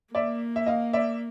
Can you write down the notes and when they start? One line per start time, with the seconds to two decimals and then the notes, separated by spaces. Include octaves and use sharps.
0.14 A#3 D5 E5
0.56 E5
0.66 D#5 F5
0.93 D5 E5